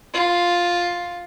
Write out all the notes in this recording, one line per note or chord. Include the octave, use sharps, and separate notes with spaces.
F4